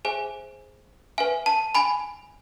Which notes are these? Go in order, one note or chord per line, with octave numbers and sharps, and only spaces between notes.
G#4 C5 E5 G#5
B4 E5 G#5
A5
G#5 B5